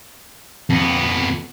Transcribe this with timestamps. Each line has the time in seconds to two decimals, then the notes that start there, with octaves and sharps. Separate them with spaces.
0.70 F2 B3